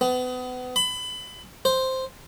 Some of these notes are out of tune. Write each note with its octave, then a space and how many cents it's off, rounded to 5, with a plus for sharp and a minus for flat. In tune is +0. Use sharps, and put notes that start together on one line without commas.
B3 +30
B5 +25
C5 +0